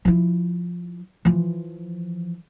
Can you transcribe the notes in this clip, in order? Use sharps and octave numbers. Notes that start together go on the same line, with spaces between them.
F3 E4
E3 F3